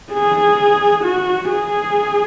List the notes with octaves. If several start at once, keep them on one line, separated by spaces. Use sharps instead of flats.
G#4
F#4
G#4